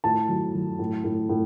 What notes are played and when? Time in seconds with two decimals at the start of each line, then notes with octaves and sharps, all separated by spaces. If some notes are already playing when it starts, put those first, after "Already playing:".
0.04 A2 A5
0.29 F#3
0.55 F#3
0.79 A2
1.04 A2
1.30 A2